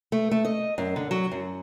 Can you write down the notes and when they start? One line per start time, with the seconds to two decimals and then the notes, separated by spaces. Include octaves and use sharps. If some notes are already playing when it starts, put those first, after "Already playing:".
0.12 A3
0.31 A3
0.45 D#5
0.78 F#2
0.96 D3
1.11 F#3
1.32 F#2